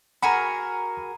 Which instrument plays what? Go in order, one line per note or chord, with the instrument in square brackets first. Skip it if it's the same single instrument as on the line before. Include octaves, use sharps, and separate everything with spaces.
[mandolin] F#4 G#4 A#4 [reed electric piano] A#5 B5